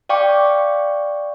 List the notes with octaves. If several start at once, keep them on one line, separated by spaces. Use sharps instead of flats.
D5 F5 G5 C#6 D6